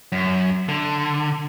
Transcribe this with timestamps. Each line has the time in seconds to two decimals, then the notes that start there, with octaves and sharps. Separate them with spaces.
0.12 F#2
0.69 D3